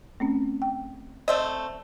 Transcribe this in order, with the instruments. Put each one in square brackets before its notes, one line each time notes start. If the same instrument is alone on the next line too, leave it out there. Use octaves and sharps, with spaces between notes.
[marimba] A3 C4 C#4
G5
[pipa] A3 C4 D#5 [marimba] D5